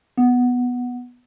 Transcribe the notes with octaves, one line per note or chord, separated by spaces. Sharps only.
B3